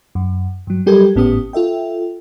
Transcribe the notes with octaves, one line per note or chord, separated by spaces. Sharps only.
F#2
G2 F#3
F#3 G3 G4 A4 A#4 G#6
G#1 A2 B3 C#4 G4 D#6
F4 A4 E5 G5